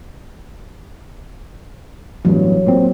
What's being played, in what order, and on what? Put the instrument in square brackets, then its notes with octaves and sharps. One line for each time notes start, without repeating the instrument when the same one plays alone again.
[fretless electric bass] A1 E2 G2 [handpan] F#3
[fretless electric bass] A#2 C4